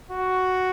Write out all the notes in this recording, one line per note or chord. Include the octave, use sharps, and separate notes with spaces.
F#4